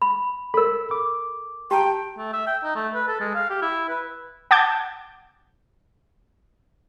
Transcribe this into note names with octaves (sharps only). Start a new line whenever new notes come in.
B5
A4 A#4 B5 E6
D6
G4 G5 A5 A#5
A3
E5
G5
D#4
A3
B4
A4
G#3
F5
G4
E4
B4
F#5 A5 D6 G6 G#6